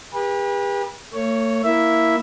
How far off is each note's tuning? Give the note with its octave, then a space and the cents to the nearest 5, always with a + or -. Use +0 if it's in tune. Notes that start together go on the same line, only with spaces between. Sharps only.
G4 +45 B4 -30
A3 +45 C#5 +0
A#3 +0 E4 +0 E5 +0